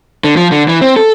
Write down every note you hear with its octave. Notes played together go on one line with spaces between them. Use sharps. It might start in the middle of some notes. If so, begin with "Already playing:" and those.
D3
F3
D3
E3
C4
A4